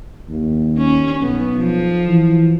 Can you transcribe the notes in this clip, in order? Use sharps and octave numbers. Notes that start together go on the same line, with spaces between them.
D#2
C#4
B1 B3
F3
E3